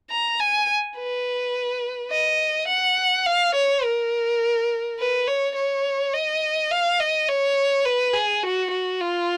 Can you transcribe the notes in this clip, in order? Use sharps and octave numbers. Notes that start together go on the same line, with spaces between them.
A#5
G#5
B4
D#5
F#5
F5
C#5
A#4
B4
C#5
C#5
D#5
F5
D#5
C#5
B4
G#4
F#4
F#4
F4